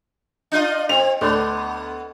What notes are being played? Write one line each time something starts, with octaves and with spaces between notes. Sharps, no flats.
D4 F4 D#5
C4 F7
D2 B3 D4